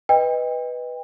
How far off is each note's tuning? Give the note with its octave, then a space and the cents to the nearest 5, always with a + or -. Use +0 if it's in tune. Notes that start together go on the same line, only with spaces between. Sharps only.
B4 +0 D#5 +0 G5 +35